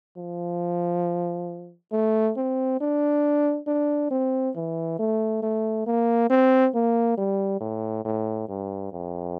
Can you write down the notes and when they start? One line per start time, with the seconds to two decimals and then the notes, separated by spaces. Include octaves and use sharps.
0.17 F3
1.92 A3
2.37 C4
2.81 D4
3.67 D4
4.11 C4
4.55 E3
4.99 A3
5.43 A3
5.86 A#3
6.30 C4
6.74 A#3
7.17 G3
7.61 A2
8.05 A2
8.49 G2
8.92 F2